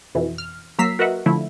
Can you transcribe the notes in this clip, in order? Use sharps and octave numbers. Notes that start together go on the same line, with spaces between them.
F2 B2 E3
F6
F#3 A#3 A#5 E6 B6 C7
F#4 A#4 B4 D#5 E5 F#5
D3 F3 A3 E4